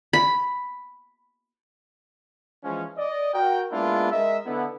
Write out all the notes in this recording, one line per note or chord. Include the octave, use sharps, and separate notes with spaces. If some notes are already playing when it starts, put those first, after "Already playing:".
B5
E3 F3 G#3 C#4
D5 D#5
F#4 A#4 G5
G#3 A#3 B3 D4 E4 F4
G#3 A#4 D#5 E5
D3 B3 E4